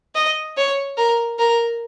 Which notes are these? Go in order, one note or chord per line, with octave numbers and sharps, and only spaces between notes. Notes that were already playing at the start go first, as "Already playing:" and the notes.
D#5
C#5
A#4
A#4